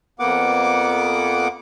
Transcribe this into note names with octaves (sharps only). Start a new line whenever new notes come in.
F2 A#3 B3 F#5 D6